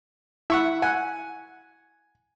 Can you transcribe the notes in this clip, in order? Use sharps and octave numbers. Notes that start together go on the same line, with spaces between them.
E4 E5 F#5 C#6
F#5 G#5